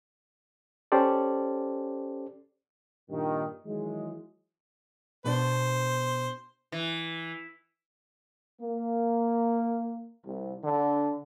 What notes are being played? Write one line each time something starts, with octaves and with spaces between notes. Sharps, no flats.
C#4 G4 A4 C5 D5
G2 A#2 D#3
D#3 E3 F#3 G#3
B2 B3 D4 C5
E3
A#3
C2
D3